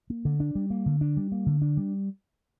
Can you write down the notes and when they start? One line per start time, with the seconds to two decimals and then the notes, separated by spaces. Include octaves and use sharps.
0.10 A#3
0.25 D3
0.40 D4
0.55 G3
0.70 A#3
0.86 D3
1.01 D4
1.17 G3
1.32 A#3
1.46 D3
1.62 D4
1.77 G3